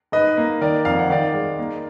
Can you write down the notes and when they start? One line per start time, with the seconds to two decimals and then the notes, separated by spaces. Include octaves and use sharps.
0.12 G#2 B4 D#5
0.37 A#3
0.61 D#3 A#4 D5
0.85 F2 F5
0.99 F#5
1.10 D#3 D5 F5
1.34 G#3
1.59 A#3